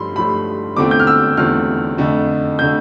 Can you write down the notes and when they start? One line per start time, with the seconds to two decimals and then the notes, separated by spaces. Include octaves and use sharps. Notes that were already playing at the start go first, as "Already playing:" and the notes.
Already playing: G2 F3 A3 B5 C6
0.16 G2 F3 A3 B5
0.77 E2 D3 A3 C4 F4 D6
0.91 G6
1.00 F6
1.07 E6
1.37 E2 D3 A3 C4 F4 F6
1.98 F2 D3 A3
2.59 D3 A3 G6